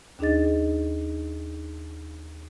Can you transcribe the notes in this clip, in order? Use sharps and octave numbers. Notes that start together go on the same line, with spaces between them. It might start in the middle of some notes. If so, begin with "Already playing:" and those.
D#2 D4 D#4 G#4 D#5 A6